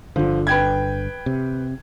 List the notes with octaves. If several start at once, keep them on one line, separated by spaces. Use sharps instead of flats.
G1 D3 F3
B4 G5 G#6
C3